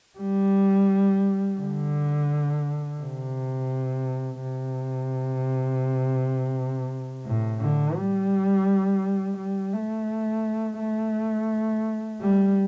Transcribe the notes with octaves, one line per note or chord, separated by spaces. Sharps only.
G3
D3
C3
C3
A2
D3
G3
G3
A3
A3
G3